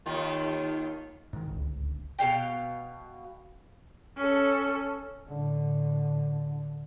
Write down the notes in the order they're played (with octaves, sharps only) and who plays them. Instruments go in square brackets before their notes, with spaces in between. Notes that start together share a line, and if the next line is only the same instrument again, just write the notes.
[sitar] D#2 D#3 F4
[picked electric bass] G#2 D#3
D1 G1 C#2
[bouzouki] B2 A3 F5 G5
[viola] C#4 A4
[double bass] A2 D3